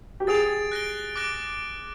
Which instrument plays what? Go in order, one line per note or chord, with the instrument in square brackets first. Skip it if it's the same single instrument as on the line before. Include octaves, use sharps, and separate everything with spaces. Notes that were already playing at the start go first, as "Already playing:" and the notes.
[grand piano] G4
[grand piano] G#4 [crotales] A6 D7 F7
[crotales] F#6 A#6 D7 G7
D6 F#6 A#6 D7